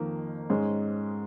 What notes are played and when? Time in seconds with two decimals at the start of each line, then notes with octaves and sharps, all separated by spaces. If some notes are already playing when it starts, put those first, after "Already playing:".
Already playing: F2 D#3 A#3
0.50 G#2 G#3 C#4